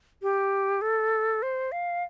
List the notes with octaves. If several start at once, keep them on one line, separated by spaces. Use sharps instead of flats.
G4
A4
C5
F5